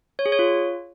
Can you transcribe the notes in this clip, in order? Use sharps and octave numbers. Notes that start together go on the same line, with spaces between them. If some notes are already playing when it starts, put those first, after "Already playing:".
C#5
G#4
C#5
F4